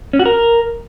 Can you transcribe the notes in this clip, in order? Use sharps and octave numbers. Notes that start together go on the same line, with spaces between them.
C#4
F#4
A#4